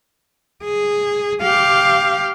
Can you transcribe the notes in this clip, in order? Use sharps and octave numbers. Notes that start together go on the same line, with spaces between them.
G#4
G4 F5